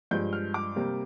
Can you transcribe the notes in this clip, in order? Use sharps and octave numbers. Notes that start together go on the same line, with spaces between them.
G2 F3 G#3 G6
F6
D6
C3 G3 A#3